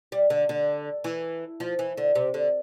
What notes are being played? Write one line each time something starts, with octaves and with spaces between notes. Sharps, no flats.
G3
D3
D3
E3
F3
E3
D3
C3
D3